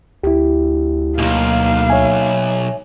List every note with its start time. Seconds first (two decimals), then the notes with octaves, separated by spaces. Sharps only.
0.23 D2 E4 G4
1.18 B1 G#2 A#3 F5
1.90 C#5 E5 G#5